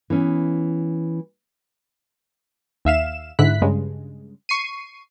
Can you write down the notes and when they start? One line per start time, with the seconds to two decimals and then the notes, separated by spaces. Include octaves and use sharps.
0.10 E3 B3 C#4
2.85 D#2 E5 F5 E7
3.39 G#2 D3 E4 F#6 B6
3.62 G2 C#3 G#3
4.49 C#6 C7 D#7